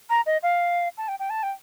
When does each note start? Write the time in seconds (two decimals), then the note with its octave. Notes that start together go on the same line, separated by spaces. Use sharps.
0.10 A#5
0.26 D#5
0.43 F5
0.97 A5
1.08 G5
1.19 G5
1.30 A5
1.43 G5